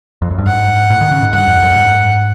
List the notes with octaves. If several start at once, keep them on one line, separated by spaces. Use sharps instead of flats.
F2
F#2
G2
G#2 F#5
A2
D#3
C#3
G#2
G2 F#5
F2
F#2
G2
G#2